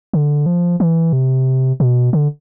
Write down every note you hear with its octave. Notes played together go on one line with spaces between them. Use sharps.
D3
F3
E3
C3
B2
D3